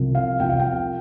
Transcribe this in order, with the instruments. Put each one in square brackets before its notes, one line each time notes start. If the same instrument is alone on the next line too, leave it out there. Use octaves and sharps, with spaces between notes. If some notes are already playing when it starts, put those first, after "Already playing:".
Already playing: [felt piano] C2 C3 F3
F5
C2 C3 F3 G5
F5
G5